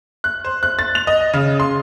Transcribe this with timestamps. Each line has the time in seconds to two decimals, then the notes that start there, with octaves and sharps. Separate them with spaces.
0.24 F#6
0.45 C5
0.63 F#6
0.79 A6
0.95 F7
1.07 D#5
1.34 C#3
1.60 C6